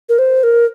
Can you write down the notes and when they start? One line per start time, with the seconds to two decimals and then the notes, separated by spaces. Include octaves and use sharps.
0.09 A#4
0.19 C5
0.43 A#4